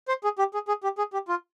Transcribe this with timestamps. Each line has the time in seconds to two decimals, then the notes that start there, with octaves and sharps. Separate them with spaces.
0.08 C5
0.24 G#4
0.39 G4
0.54 G#4
0.68 G#4
0.83 G4
0.98 G#4
1.13 G4
1.28 F4